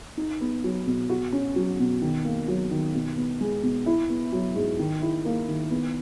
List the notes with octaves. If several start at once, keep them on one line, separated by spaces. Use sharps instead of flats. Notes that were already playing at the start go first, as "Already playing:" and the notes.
D#4
B3
F#3
B2
F#4
C#4
F#3
B2
D#3
A#3
F#3
D#3
B2
B3
G#3
B2
E4
B3
F#3
G#2
D#3
E4
A#3
D#3
B3